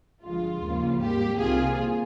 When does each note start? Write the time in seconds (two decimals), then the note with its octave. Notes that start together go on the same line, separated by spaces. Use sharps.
0.23 G1 G2 F3 G#3 F4
0.62 D#2 C#3 F3 A#3
1.00 G#1 G#2 G3 A#3 G4
1.38 C2 C3 D#3 A#3 F4 G#4